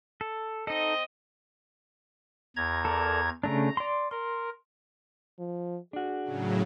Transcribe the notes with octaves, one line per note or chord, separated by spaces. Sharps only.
A4
C4 D#4 A4 D#5
E2 A#5 G#6
A4 A#4 D5
C#3 A3 D4 A#5
D5 C6
A#4 C6
F3
D4 F#4 G#4
A2 C#3 F#3